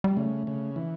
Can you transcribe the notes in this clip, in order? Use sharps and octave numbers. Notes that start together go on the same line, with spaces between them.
G3
C#3 A3
C#3
E3